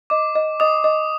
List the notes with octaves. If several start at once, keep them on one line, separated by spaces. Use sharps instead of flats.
D#5 D6
D#5
D#5 D#6
D#5